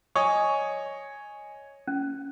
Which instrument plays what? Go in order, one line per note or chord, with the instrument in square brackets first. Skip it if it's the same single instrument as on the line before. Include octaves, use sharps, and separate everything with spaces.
[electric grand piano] C#5 D#5 G#5 [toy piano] C#6 D#6
[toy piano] C#4